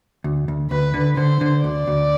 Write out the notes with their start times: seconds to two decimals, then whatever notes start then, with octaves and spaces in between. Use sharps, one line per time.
0.24 D2
0.48 D2
0.71 D2 B4
0.94 D3
1.17 D3 C5
1.41 D3
1.64 D2 D5
1.87 D2